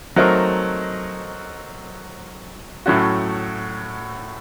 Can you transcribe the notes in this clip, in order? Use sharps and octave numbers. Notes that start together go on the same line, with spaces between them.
F#3 A3 C4 D#4 A#4
A2 F#3 A3 C#4 F#4